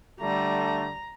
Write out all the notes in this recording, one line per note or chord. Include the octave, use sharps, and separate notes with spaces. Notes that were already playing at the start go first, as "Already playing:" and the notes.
D3 G3 A3 A#5